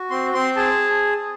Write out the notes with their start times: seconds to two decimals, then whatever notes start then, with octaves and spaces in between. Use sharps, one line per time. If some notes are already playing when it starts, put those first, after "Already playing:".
Already playing: F#4
0.10 C4 C6
0.34 C4 C6
0.56 G#4 A5